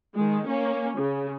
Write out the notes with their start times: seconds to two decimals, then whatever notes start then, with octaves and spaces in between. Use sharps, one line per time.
0.15 D#3 G#3
0.47 A#3 C#4
0.98 C#3